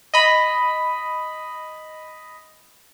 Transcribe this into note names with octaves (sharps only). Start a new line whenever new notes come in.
D#5 B5